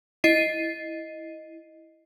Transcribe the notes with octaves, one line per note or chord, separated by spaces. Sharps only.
E4 D#5 C7 D#7